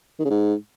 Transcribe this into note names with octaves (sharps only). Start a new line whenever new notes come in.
D#3
C#3
G#2